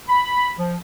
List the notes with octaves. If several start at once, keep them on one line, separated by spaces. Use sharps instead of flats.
B5
F3